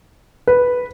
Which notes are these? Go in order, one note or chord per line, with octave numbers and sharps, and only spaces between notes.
B4